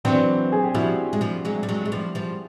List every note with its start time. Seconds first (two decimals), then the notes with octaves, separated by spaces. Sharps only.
0.05 E3 F#3 C4 D4
0.52 G#4
0.64 G4
0.75 F3 G3 E4 F#4
1.13 G#3
1.21 F3 G3
1.45 F#3 G#3
1.63 G3
1.69 F#3 G#3
1.85 G#3
1.92 F3 G3
2.15 F3 G3